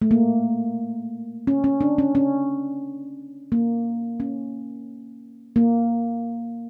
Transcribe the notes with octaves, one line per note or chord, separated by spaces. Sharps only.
A3
A#3
C#4
C#4
D4
C#4
C#4
A#3
C#4
A#3